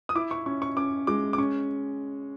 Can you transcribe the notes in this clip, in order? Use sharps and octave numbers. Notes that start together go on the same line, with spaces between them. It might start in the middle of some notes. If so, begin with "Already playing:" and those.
D#6
E4 D6
C#6
C#4 C#6
C#6
C#4 D6
G#3 D6
D6
C#4 C#6